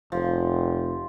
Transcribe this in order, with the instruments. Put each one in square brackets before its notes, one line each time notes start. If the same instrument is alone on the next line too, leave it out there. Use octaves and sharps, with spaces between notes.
[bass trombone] F1 [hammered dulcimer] F3